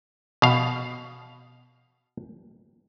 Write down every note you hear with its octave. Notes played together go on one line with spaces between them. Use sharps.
B2 F5